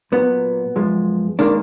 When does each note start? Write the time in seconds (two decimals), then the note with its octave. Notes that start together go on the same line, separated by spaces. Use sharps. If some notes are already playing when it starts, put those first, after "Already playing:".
0.12 A#2 F#3 B3
0.76 F#2 F3 G#3
1.39 D#3 G#3 A#3 D4